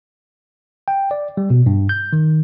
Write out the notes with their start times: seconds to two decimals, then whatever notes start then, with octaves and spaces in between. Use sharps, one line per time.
0.88 G5
1.11 D5
1.37 G3
1.50 B2
1.66 G2
1.89 G6
2.13 D#3